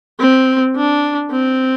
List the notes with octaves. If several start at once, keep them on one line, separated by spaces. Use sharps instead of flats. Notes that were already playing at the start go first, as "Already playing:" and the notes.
C4
D4
C4